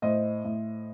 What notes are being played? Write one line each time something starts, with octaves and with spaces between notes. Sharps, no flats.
A2 C5 D#5
A2